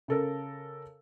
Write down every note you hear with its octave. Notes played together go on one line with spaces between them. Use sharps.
C#3 A4 A#4